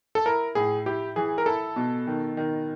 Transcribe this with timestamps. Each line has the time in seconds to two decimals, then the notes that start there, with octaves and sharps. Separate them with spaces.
0.15 A4
0.26 E4 A#4
0.55 A2 G#4
0.86 E4 G4
1.16 E3 G#4
1.38 A#4
1.46 E4 A4
1.76 B2
2.07 D#3
2.37 D#3